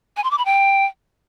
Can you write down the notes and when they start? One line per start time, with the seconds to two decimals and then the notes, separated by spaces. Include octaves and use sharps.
0.17 G#5
0.24 C6
0.31 D6
0.38 B5
0.45 G5